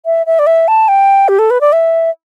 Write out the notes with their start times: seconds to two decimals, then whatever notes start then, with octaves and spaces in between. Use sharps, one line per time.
0.06 E5
0.26 E5
0.39 D5
0.47 E5
0.68 A5
0.88 G5
1.28 G4
1.39 A4
1.50 B4
1.61 D5
1.73 E5